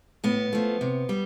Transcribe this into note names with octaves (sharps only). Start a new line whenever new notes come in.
A2 B3
F3 A3
C3
G3